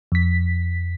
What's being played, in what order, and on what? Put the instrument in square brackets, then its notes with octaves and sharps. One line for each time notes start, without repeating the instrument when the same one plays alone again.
[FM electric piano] F2 B6